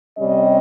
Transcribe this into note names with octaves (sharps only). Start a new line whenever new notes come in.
C3 G3 C#4 D#5